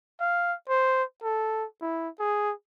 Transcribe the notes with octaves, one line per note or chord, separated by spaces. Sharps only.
F5
C5
A4
E4
G#4